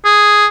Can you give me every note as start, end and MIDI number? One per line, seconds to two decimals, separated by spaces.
0.05 0.46 68